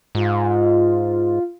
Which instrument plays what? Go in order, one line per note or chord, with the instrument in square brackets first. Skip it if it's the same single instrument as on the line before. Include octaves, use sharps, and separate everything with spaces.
[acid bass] G#2 [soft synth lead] F4